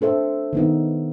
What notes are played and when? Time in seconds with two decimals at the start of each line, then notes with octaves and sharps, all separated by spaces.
0.01 D4 A4 C5 E5
0.53 D#3 B3 D#4